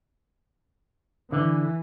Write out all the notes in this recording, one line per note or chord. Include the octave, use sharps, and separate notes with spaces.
D3 E3